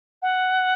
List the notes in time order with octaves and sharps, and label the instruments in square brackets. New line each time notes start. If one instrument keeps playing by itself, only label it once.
[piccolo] F#5